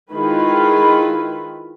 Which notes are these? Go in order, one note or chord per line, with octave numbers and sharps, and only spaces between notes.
D#3 G#3 E4 F4 B4